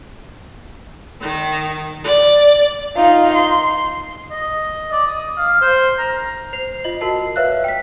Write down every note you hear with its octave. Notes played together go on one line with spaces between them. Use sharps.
D#3
D5
D#4 F4
C6
D#5
D5
D#6
F5
C5
A#5
C5 C7 F7
F4 D#5 F#7
F#4 A#4 D#5 A5 C7
B4 C#5 E5 F5 F6 F#6
G5 B6